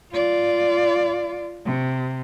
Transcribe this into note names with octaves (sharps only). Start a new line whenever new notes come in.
F4 D5
C3